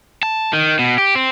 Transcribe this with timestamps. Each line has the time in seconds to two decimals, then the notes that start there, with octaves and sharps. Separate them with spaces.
0.23 A5
0.53 D#3
0.79 B2
0.98 G4
1.15 C4